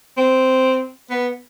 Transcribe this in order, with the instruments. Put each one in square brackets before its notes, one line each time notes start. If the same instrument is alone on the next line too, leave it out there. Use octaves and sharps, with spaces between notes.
[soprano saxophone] C4
B3